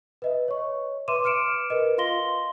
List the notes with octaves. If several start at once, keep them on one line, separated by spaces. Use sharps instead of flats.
B4 D#5 E5
C#5 C#6
B4 E5 C6 D6 D#7 E7
D6 F6 C#7 D7 E7
A#4 B4 D#5
F4 F5 C6 A#6 G7